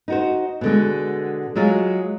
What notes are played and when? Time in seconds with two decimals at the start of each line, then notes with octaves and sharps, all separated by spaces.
0.08 D#4 F#4 C5
0.61 B2 D3 G#3
1.55 F#3 G#3 F4 G#4